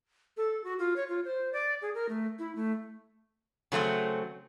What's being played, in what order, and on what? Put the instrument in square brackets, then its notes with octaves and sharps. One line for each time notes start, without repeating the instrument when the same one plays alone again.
[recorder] A4
F#4
F4
C#5
F4
C5
D5
G#4
A#4
A3
E4
A3
[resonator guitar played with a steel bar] C#3 F#3 A3 C4